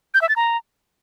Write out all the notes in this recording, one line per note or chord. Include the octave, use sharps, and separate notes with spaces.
G6
E5
A6
A#5